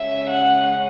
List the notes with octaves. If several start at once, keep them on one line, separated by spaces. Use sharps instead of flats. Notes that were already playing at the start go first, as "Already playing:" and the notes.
Already playing: C#3 G#3 C#4 E5
F#5